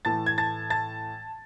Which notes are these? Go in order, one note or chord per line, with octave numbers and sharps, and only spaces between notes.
A2 E3 A3 A5 A6
G#6
A5 A6
A5 A6